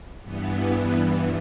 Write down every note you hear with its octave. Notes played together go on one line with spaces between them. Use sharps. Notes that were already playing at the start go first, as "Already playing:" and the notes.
G2 E3 B3